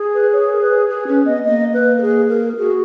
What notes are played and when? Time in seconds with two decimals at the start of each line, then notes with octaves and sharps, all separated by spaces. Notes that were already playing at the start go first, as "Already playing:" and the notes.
Already playing: G#4
0.14 B4
0.33 C#5
0.52 A#4
0.61 B4
0.89 G#4
1.07 C#4 B4
1.25 B3 D#5
1.45 A#3 D#5
1.73 B4
1.97 A#4
2.02 G#4
2.29 A#4
2.57 F#4 G#4